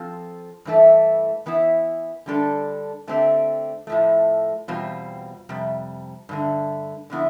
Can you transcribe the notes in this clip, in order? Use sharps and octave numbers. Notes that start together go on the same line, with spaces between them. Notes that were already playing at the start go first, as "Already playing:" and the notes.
Already playing: F3 C4 F4 A4
G2 E3 A3 E4 A4
E3 B3 E4
D3 G3 D4 A4
D3 A3 C4 G4
A2 F3 A3
E2 B2 G3 C4 F4
F2 C3 G3
G2 D3 A3
D3 F3 B3 E4